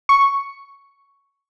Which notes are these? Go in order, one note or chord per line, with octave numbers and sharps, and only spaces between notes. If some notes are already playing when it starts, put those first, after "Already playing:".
C#6